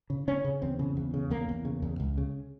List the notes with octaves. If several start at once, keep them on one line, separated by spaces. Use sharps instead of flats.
C#3
C#3 C#4
C#3
E2 C4
C#3
E2
C#3
E2 A#3
E2
C#3
E2
C#2
C#3